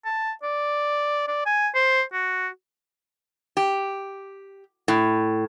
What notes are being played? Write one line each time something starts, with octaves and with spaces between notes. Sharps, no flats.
A5
D5
D5
G#5
C5
F#4
G4
A2